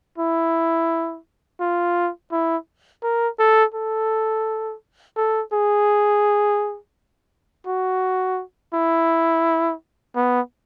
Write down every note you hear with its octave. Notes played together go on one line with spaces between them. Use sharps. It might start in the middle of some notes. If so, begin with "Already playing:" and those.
E4
F4
E4
A#4
A4
A4
A4
G#4
F#4
E4
B3